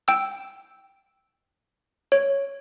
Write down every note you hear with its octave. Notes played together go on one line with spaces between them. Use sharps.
G5 E6
C#5